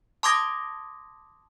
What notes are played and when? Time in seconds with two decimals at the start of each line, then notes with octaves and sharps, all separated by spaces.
0.23 A5 C6 D6 D#6 G#6 A#6